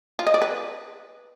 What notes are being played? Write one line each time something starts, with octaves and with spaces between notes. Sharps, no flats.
F4
D#5
D5
B4